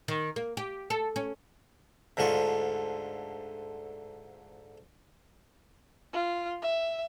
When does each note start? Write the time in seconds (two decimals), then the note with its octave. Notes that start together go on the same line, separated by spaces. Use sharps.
0.08 D#3
0.36 A#3
0.57 G4
0.90 A4
1.16 C#4
2.17 D2 G#2 D3 F4 C#6
6.13 F4
6.62 E5